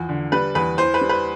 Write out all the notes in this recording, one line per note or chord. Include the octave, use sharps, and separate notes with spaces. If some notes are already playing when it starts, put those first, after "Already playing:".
Already playing: E2 F3
D3
G3 B4
E2 B4
E3 C5
B4
G3
B4